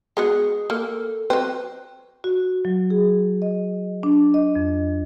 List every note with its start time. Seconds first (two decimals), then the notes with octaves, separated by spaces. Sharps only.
0.17 G#3 B3 F#4 G#4
0.70 A#3 A4
1.30 F#3 C4 B4
2.24 F#4
2.65 F#3
2.90 G#4
3.42 D#5
4.03 D4
4.34 D#5
4.56 F2